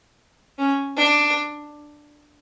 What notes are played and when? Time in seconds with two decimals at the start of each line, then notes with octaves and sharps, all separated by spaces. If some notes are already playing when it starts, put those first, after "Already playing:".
0.58 C#4
0.97 D4